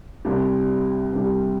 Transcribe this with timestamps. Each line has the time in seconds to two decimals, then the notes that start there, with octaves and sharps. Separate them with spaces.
0.25 C2 C3 G3 D4 G4
1.12 C2 C3 G3 D4 G4